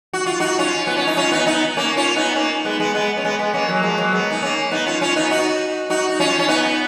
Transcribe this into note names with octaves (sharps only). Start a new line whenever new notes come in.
F#4
F4
D#4 F#4
C#4 F4
B3
C#4
D#4
C#4 F4
B3 D#4
B3 D#4
A#3 C#4
C#4 F4
B3 D#4
A#3 C#4
G#3 B3
G#3 B3
G#3 B3
C#4
G#3 B3
G#3 B3
A#3 C#4
F#3 A#3
F3 G#3
F#3 A#3
G#3 B3
D#4
A#3 C#4
B3 D#4
C#4 F4
C#4 F4
B3 D#4
D#4 F#4
D#4 F#4
D#4
C#4 F4
C#4
B3 D#4